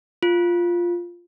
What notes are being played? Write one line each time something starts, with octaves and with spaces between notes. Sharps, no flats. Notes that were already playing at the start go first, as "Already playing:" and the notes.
F4